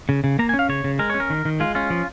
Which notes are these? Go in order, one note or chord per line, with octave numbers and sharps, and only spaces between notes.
C#3
C#3
A#3 A#5
G#5
C#4
F5
C#3 C#5
C#3
G#3 A#4
C#4 C#5
A#4
D#3
D#3
G#3 F4
C#4 F4
F3